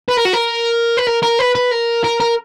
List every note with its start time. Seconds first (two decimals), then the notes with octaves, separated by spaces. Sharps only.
0.08 B4
0.17 A#4
0.25 F#4
0.33 A#4
0.97 B4
1.07 A#4
1.23 A#4
1.39 B4
1.55 B4
1.72 A#4
2.04 A#4
2.20 A#4